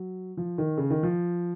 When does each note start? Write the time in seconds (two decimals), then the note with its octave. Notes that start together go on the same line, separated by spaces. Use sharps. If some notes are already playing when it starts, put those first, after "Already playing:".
Already playing: F#3
0.37 F3
0.58 D#3
0.78 C#3
0.90 D#3
1.03 F3